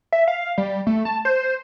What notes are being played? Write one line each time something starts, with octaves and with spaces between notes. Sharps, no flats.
E5
F5
G3
A3
A5
C5